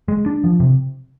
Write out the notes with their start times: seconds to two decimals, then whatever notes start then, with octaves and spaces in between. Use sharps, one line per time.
0.08 G#3
0.26 D4
0.44 F3
0.60 C3